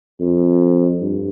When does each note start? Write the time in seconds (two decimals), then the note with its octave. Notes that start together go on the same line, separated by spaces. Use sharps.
0.20 F2
1.01 G2